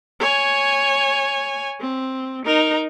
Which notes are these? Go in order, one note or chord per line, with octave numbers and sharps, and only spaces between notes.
C#5 G#5
C4
D#4 A#4